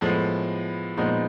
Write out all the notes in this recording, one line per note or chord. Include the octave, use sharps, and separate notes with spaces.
A2 F3 G#3 B3
A#2 F3 G#3 B3 D#4